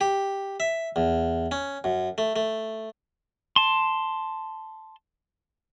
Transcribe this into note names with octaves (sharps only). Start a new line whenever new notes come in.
G4
E5
E2
C#4
F#2
A3
A3
A5 C6